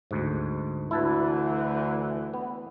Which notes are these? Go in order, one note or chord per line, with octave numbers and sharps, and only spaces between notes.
D2 G#2
D2 E3 E4 A4 B4
B3